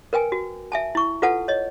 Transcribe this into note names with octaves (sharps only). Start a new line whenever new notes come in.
A#4 B4 G5 G#5
F#4
E5 G#5 A5
E4 C#6
F4 A4 B4 F#5 A5
C#5 D#5